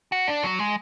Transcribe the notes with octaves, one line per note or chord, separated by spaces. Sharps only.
F#4
D4
F#3
G#3